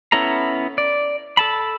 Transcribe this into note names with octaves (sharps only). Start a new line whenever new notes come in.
B3 C#4 E4 A4 A#5
D5
A4 A5 B5